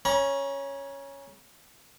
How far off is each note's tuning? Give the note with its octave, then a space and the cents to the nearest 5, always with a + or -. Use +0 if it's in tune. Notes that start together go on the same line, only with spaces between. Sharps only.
C#4 +0 A#5 +40